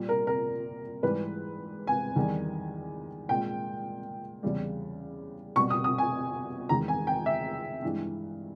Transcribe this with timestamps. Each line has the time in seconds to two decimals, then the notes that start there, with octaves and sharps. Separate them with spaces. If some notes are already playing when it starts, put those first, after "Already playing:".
Already playing: A#2 G3
0.09 A#4
0.27 A#4
1.03 G#2 E3 G3 B4
1.87 G#5
2.16 E2 D#3 G3
3.29 A#2 G#3 G5
4.43 E2 C#3 G3
5.56 B2 G3 C#6
5.70 D#6
5.84 D#6
5.98 G#5
6.69 E2 D#3 G#3 A#5
6.88 G#5
7.07 G5
7.26 E5
7.82 G2 E3 G#3